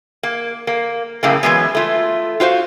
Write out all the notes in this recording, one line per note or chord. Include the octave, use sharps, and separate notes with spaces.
A#3
A#3
F#2 A2 C#3 A#3
E3 F#3 G#3 B3
A3 F4
F4 F#4 C5 F5